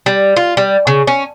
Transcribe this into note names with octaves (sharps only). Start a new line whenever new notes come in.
G3
F4
G3
C#3
C#4